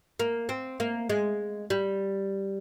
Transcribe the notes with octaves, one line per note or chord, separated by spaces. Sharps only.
A#3
C4
A#3
G#3
G3